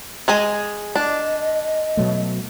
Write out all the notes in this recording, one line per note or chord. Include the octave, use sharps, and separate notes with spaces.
G#3 G#4 D#5
D4 D#5
B2 F#3 A3